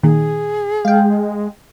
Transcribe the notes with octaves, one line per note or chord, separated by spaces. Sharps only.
A#2 D#3 G#4
G#3 F5 G5